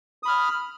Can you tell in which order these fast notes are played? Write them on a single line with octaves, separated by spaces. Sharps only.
D#6 B5 F6